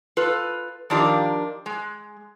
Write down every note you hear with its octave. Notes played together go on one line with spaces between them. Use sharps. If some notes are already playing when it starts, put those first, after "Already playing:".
F4 A4 B4
D#3 F3 D4 F4 G4 A#4
G#3